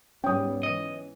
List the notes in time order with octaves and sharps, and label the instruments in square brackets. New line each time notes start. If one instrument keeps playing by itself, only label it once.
[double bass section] G#2 G3 B3 [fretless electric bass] C#4 [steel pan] G5 D#6
[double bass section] E3 [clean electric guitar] D#5